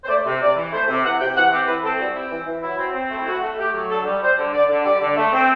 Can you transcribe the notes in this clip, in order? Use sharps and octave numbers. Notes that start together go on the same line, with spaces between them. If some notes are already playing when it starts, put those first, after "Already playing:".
C5
A3 D5
C3
C3 D5
E3
A3 C5
C3
E3 F#5
C3 G5
E3 F#5
C4 G4
E3 B4
C4 A4
G3 F#4
C4 E4
E3
E3
F#3 E4
C4
C4
A3
E4
A3 F#4
A3
A3 G4
F#3
D3 A4
G3
G3 C5
D3
D3 D5
D3
G3 D5
D3
A3
C4